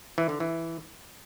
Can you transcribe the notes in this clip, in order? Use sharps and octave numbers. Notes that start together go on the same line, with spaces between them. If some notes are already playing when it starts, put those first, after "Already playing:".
E3
D3
E3